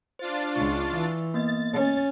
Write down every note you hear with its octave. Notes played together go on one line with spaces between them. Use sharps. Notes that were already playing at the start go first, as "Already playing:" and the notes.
D4 F4 C5 A6
C#2 C#6
E3
A#3 B3 D#5 A6
C#4